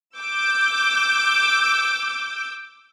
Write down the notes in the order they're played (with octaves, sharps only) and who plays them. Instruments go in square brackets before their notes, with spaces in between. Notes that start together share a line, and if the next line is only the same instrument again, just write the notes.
[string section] D6 E6 G6